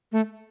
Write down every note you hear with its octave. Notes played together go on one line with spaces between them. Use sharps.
A3